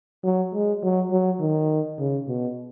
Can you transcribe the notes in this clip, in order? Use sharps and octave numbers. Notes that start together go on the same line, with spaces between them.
F#3
G#3
F#3
F#3
D#3
C#3
B2